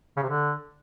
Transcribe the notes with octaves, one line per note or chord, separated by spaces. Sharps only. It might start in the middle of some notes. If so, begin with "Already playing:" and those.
C#3
C3
D3